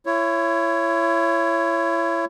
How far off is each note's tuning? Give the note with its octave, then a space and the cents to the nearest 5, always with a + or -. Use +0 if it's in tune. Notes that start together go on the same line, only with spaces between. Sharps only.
E4 +30 C#5 +0